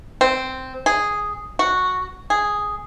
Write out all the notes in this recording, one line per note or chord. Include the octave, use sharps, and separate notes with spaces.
C4
G#4
F#4
G#4